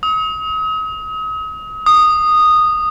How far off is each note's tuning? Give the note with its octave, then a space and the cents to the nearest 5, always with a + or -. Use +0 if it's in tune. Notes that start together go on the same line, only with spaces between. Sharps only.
D#6 +40
D#6 -10